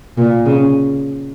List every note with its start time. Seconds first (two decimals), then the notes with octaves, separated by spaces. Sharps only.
0.17 A#2
0.46 C#3